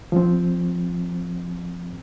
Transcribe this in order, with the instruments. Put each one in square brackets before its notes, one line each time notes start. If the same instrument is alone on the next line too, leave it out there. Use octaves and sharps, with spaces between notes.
[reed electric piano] F3 C4